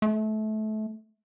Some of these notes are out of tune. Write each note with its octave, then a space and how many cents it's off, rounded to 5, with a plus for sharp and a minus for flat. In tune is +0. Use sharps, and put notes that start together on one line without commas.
A3 -25